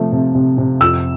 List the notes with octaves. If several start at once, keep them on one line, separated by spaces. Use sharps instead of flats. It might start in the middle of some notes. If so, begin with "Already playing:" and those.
Already playing: C3 F3 A3
C3
C3
C3
F2 E6